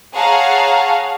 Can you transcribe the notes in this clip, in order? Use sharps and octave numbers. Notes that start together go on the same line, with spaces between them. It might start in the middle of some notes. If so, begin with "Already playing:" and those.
G#4 C#5 F5 F#5 A5 A#5